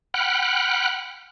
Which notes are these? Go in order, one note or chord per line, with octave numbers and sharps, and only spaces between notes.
F#5 G5 B5 F6 F#6